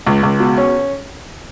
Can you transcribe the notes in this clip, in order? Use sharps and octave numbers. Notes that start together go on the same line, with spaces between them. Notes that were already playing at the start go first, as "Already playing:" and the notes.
C#2
C#2
B2
C#4